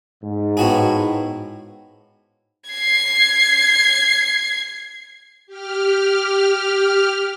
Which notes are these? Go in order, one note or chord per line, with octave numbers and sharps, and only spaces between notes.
G#2
A2 B3 F#4 G#4
G#6 C7
G4 F6